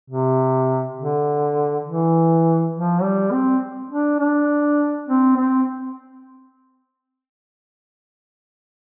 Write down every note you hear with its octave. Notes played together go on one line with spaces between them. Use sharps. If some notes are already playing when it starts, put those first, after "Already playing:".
C3
D3
E3
F3
G3
C4
D4
D4
C4
C4